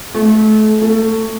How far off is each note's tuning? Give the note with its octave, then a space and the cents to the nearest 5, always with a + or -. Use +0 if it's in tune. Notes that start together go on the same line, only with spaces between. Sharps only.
A3 -30
A3 +20